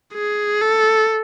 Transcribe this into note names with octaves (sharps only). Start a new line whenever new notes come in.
G#4
A4